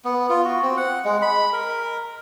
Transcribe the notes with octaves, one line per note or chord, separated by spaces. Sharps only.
B3
F4
F#4
C4
F#5
G#3
B5
A#4